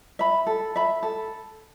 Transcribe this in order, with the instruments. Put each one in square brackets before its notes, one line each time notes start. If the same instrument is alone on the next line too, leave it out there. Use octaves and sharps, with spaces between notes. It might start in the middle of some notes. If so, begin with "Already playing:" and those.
[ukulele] E5 B5
A4
E5 B5
A4